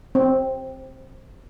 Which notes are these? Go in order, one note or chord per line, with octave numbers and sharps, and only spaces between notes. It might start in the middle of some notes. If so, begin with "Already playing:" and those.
C4